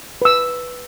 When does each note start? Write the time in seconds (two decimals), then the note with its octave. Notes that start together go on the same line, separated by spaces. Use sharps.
0.22 B4 E6